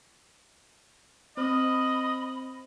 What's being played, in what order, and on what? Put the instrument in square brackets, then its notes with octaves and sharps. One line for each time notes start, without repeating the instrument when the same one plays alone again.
[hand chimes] C4 C5 F6 [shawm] D#5 [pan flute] B5